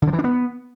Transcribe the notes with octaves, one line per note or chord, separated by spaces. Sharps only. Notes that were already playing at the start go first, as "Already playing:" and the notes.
D3
F3
E3
D4
B3